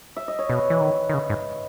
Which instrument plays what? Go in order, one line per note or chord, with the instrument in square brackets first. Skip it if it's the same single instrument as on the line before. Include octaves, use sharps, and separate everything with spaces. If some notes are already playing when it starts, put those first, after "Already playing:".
[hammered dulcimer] E5
D#5
C#5
[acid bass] B2 [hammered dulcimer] B4
[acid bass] E3
D#3
D#3
C#3
G#2